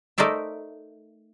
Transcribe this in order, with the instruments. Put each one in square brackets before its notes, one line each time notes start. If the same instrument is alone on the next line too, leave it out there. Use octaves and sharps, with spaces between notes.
[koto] A3 D#4 A#4 C5 D5 E5